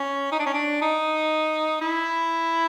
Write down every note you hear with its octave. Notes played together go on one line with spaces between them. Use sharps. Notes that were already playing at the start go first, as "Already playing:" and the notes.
Already playing: C#4
D#4
D4
C#4
D4
D#4
E4